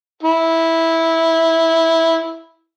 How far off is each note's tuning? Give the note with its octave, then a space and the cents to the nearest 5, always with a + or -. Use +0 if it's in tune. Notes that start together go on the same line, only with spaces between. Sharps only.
E4 -10